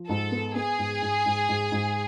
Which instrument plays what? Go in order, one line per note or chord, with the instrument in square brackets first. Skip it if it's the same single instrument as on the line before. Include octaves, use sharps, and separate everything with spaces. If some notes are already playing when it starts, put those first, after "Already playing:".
Already playing: [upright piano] F3
[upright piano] G#2 [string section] A4
[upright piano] B3
[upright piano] B3 [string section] G#4
[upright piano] G#2
G#2
G#2
G#2
G#2